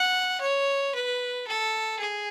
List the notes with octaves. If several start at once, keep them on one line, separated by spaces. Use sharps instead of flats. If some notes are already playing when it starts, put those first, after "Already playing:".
Already playing: F#5
C#5
B4
A4
G#4